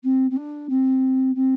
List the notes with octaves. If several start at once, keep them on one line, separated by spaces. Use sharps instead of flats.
C4
C4
D4
C4
C4